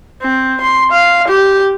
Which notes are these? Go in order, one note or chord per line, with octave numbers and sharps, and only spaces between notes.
C4
C6
F5
G4